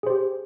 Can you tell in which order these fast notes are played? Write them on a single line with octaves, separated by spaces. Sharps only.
G#4 C5 G4